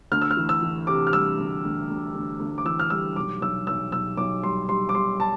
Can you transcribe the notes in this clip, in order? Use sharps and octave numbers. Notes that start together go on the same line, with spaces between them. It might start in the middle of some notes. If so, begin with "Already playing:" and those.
D2 F6
E6
F6
E3
E6
E3
C3 D6
F6
G3 E6
D2
D2
D2
D2
D2
D6
E3 E6
F6
G3 E6
B1 D6
B1 E6
B1 E6
B1 E6
B1 D6
G3 C6
G3 C6
D6
G3 C6
A5